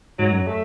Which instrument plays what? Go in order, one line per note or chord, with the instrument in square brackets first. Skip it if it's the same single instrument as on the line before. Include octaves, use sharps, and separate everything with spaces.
[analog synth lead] G#2 [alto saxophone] F#3
[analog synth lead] F#2
[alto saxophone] A3